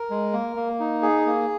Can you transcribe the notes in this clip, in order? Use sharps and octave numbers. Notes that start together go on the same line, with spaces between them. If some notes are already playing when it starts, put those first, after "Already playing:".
Already playing: A#4
G#3
A#3
A#3
D#4
G#4
A#3